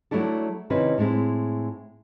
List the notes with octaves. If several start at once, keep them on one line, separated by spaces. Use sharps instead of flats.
F#3 A3 D4 E4 A4
C3 D#3 C4 C#4 E4 B4
A2 G#3 C4 E4